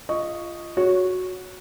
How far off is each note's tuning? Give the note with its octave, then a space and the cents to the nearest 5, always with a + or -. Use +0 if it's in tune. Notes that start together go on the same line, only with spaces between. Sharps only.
F4 -20 D#5 +0 C#6 +0
F#4 -10 C#5 +10